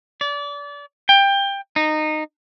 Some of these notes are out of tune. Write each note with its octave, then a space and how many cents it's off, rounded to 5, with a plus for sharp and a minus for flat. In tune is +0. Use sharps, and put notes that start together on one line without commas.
D5 -30
G5 +20
D#4 -15